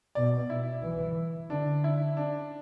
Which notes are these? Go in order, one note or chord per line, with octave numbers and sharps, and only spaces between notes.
B2 D5
E4
E3
D3 D4
E4
D4